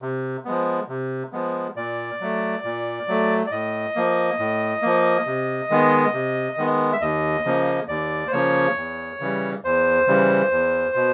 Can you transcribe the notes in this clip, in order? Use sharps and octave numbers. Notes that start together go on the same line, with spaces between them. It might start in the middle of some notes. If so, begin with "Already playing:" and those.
C3
F3 G#3 B3
C3
F3 G#3 B3
A#2 D5
F#3 A3
A#2
F#3 A3
D5
A2 D#5
F3 A#3
A2
F3 A#3
C3
D#3 G#3 B3
C3
D#3 G#3 B3
E5
D#2 D#5
C#3 F3 A#3
D#2 D5
C5
C#3 F3 A#3 C#5
E2
C#3 E3 G3
E2 C5
C#3 E3 G3
E2
B2